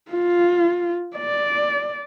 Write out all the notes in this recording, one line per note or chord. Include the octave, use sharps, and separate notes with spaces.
F4
D5